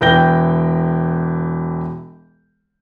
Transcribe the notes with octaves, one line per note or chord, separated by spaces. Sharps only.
E1 E3 G5 G6 A#6 G7